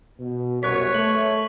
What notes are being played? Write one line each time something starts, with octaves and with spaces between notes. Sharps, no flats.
B2
C2 F#2 C#5 C#6 F#6 B6
A3 F#7